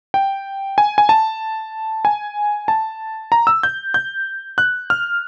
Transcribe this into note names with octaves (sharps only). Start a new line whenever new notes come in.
G5
G#5
G#5
A5
G#5
A5
A#5
E6
G6
G6
F#6
F6